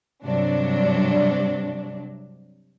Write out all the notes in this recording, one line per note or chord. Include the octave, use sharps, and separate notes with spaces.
G2 C3 F#3 D4